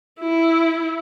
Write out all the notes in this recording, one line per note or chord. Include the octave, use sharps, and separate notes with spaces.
E4